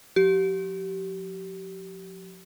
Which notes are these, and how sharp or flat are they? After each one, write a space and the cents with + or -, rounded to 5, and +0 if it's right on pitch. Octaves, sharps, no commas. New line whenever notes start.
F3 +40 G4 -30